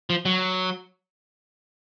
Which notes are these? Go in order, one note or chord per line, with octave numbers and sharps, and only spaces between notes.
F3
F#3